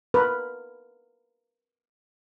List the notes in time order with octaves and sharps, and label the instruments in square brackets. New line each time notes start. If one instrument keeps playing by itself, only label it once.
[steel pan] A#4 B4